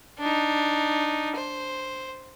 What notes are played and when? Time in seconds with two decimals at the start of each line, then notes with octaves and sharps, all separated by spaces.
0.19 D4 D#4
1.36 C5